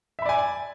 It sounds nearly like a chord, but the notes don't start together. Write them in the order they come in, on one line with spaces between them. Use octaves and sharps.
E5 B5 D5 G#5